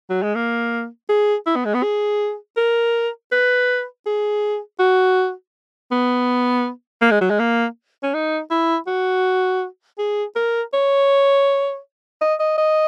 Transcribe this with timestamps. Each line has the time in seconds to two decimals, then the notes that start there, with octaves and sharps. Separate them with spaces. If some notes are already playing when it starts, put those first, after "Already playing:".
0.10 F#3
0.23 G#3
0.35 A#3
1.09 G#4
1.46 E4
1.56 B3
1.65 G#3
1.74 B3
1.83 G#4
2.57 A#4
3.32 B4
4.06 G#4
4.79 F#4
5.92 B3
7.02 A#3
7.11 G#3
7.21 F#3
7.30 G#3
7.39 A#3
8.03 C#4
8.14 D#4
8.51 E4
8.87 F#4
9.98 G#4
10.36 A#4
10.74 C#5
12.21 D#5
12.40 D#5
12.58 D#5